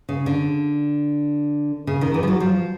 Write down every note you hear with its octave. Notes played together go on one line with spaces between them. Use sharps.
C#3
D3
C#3
D#3
E3
F3
F#3
F3